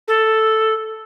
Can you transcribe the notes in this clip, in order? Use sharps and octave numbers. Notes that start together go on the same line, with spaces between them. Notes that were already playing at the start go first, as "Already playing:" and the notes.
A4